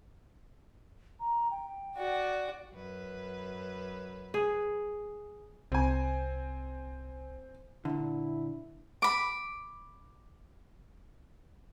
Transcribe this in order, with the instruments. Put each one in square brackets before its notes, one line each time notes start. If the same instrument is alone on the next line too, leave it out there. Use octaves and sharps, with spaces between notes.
[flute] A#5
G5
[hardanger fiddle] F#4 D5
[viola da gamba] F#2 B4
[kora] G#4
[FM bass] C2 [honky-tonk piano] C4 G#5
[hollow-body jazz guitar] A#2 D3 [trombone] E4
[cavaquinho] B5 D6